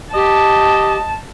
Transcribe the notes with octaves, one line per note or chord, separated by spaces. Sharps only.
G4 D#5 A5